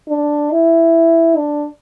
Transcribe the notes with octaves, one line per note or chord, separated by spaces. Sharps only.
D4
E4
D4